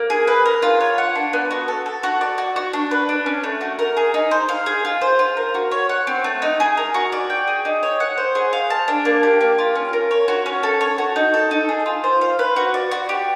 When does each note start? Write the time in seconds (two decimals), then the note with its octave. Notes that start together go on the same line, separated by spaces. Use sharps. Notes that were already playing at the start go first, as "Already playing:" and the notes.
Already playing: A#3
0.10 G#4
0.27 B4
0.46 A#4
0.62 F4
0.81 C#5
0.98 F#5
1.15 D4
1.33 B3
1.51 F#4
1.68 A4
1.86 A4
2.03 F#4
2.21 D5
2.38 F#4
2.56 F#4
2.73 D4
2.91 B4
3.09 D4
3.26 C#4
3.44 A3
3.61 F#4
3.79 A#4
3.97 G#4
4.14 D#4
4.31 C5
4.49 F5
4.66 G#4
4.85 F4
5.01 C5
5.19 F4
5.37 A#4
5.54 F#4
5.71 C#5
5.89 F#5
6.07 C4
6.24 A3
6.42 D#4
6.60 G#4
6.77 A#4
6.94 F#4
7.12 D5
7.30 G5
7.47 G#4
7.65 D#4
7.83 C#5
8.00 F#5
8.18 C5
8.35 G#4
8.53 F5
8.70 A5
8.88 D4
9.05 A#3
9.23 G4
9.41 A#3
9.58 F4
9.75 C#4
9.93 A#4
10.11 C#5
10.28 F#4
10.46 C#4
10.63 A4
10.81 C#5
10.98 F#4
11.16 D#4
11.34 A4
11.51 D#4
11.69 G#4
11.86 F4
12.04 C5
12.21 F5
12.39 B4
12.56 F#4
12.74 D5
12.91 F#4
13.09 G4